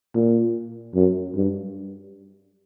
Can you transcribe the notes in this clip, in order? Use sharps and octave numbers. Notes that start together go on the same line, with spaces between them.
A#2
F#2
G2